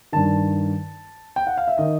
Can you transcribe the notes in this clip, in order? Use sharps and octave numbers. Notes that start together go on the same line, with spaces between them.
G2 D#3 A5
G5
F#5
F5
E5
D#3 D#5